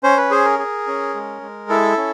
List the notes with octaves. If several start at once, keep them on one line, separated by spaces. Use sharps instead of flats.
C#4 C5
B4
G#4 C5
A#4
G#4
C#4
G#3
G#3
E4 A4
C#4